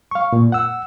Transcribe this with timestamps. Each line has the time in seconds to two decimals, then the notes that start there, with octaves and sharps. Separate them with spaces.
0.11 F5 C#6
0.33 A#2
0.52 F#5 E6